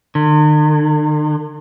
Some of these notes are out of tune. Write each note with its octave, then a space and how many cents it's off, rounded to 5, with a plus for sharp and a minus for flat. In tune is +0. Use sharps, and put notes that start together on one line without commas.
D#3 -45